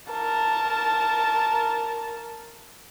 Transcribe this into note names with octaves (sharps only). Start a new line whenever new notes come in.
A#4 A5